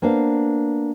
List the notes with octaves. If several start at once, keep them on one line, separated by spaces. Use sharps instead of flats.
A#3 B3 D4 C5 F5